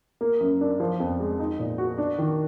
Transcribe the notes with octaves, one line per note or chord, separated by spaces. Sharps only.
A#3
F#2
D4
F3
F2
G#3
D#4
A#2
F#4
D4
D#3